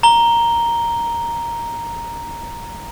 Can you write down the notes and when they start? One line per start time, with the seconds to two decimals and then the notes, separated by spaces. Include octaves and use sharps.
0.03 A#5 G7